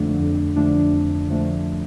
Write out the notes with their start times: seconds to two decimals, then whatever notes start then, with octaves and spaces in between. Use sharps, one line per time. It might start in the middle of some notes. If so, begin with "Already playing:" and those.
Already playing: F2 D3 F3 A3 D4
0.20 F2
0.56 D3 F3 A3 D4
0.92 F2
1.28 D3 F3 A3 D4